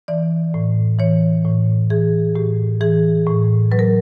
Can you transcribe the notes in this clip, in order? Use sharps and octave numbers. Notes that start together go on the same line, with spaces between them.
E3 D5
A2
E3 C#5
A2
E3 G#4
A2 G4
E3 G#4
A2
F#3 B4
A#4